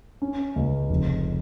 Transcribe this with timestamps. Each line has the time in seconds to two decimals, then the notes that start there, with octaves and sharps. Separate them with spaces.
0.22 C#4
0.56 C#2
0.89 F1